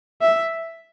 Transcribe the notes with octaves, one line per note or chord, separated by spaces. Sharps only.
E5